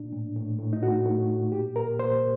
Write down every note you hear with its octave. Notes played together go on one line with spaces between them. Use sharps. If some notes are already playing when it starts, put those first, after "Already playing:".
Already playing: A#2 D4
A2
A2
A2
D#4
A2 F#4
A2
A2
A#2 G4
A#2 A#4
A#2 C5